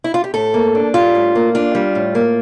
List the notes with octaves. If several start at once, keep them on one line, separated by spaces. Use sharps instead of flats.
E4
F4
G4
A2 A4
A#3
D4
G3 F4
A2
A#3
D4 F4
G3
A2
A#3